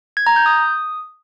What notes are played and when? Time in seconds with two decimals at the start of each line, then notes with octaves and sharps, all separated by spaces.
0.17 G#6
0.27 A#5
0.36 G6
0.46 D#6